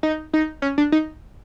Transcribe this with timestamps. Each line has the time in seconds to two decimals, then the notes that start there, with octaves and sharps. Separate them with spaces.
0.03 D#4
0.34 D#4
0.62 C#4
0.78 D4
0.92 D#4